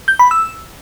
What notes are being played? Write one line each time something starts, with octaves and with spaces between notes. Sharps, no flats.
G6
B5
E6